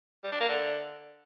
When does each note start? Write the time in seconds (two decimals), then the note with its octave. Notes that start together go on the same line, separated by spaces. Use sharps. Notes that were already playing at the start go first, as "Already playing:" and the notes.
0.24 G3
0.32 D4
0.40 A#3
0.49 D3